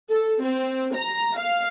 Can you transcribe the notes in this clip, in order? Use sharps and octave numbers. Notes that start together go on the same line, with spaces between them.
A4
C4
A#5
F5